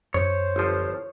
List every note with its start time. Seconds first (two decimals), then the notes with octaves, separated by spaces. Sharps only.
0.14 F#2 C5 C#5
0.56 G1 F3